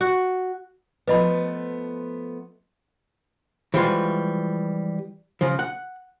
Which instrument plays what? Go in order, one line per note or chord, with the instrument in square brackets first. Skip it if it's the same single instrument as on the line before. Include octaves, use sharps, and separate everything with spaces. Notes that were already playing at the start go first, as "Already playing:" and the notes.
[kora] F#4
[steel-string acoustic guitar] F3 A3 B3 [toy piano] B4 D#5 B5
[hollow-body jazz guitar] E3 F3 G3 G#3 F4 F#4
C#3 F3
F#5